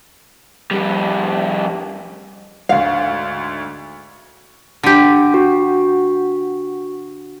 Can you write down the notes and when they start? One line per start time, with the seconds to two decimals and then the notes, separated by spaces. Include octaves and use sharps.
0.71 F2 G3
2.69 D2 G#2 F5
4.83 D3 G4
5.34 F#4